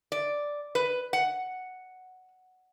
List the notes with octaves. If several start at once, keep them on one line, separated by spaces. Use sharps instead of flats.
D5
B4
F#5